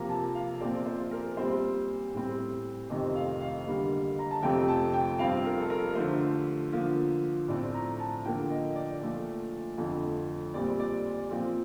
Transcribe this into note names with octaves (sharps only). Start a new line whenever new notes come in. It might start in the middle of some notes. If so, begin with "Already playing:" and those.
Already playing: C3 F3 A#3 A#5
A5
F5
A#2 F3 C4 D5
C5
A#4
A#2 G3 C4 C5
A2 G3 C4
F2 C3 D#3 A3 C4 D#5
F5
F5
D3 G3 A#3
A#5
A5
F2 C3 F3 A3 C4 G5
A5
G5
G2 F3 C4 F5
A#4
A4
A#4
D3 F3 A3 C5
D3 F3 A#3
A2 F3 A3 C4 D5
A#5
A5
D3 F3 A#3 G5
D#5
D5
A#2 F3 A3
F2 D3 F3 A3
A#2 G3 C4 D5
D5
A#2 F3 C4